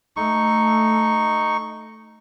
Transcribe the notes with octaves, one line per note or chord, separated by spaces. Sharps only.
A3 D#4 C#6